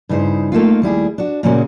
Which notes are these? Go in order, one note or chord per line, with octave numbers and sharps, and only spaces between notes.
G2 C#3 D#4 E4 C5
A3 A#3 D#4 F4
D#2 G3 E4 G#4
D4 F#4
A#2 C#3 G#3 A#3 C#4 F#4